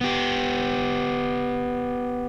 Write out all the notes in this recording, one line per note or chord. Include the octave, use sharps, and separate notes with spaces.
B3 G4